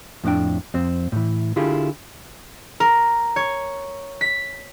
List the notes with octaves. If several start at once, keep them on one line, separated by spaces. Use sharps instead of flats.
F2 A2 F3 D4 G5
F2 C4
A2 E3
D3 E4 F4 G4 G#4
A#4
C#5
B6